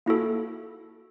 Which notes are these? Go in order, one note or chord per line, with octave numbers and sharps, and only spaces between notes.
A#3 E4 F#4 A4